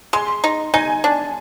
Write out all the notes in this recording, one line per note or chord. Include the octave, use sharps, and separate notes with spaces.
G#3 C6
D#4
D#4 G#5
D4